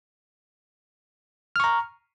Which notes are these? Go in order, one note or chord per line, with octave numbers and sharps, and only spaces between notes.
A#5 C#6 F6